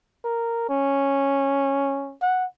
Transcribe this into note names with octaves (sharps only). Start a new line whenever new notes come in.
A#4
C#4
F#5